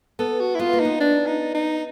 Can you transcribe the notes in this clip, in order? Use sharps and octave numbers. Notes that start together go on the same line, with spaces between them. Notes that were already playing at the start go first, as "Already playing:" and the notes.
B3 A4
F#4
E4
B3 F4
A#3
B3 D#4
D4
D#4
D#4